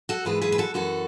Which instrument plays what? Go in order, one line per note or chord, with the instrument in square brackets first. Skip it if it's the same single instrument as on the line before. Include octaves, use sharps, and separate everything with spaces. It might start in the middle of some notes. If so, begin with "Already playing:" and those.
[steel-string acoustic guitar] F#4 A4
G#2 E3 G#4 B4
G#4 B4
B4
F#4 A4
F#2 E3 F#4 A4